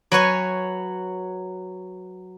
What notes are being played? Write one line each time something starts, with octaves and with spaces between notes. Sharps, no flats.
F#3 B4 C#5 G#5